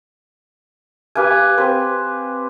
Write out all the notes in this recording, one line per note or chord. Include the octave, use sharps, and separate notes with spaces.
G4 B4 F5 G#5
C4 B4